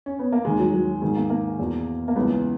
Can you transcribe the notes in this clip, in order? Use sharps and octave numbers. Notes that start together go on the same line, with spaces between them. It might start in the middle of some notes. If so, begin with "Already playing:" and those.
C#4
B3
A#3
D#2 D#3 G#3
F#3
F#3
G#2 D#3 G#3
A#3
A#3
E2 B2
A#3
C#2 C#3 E3 B3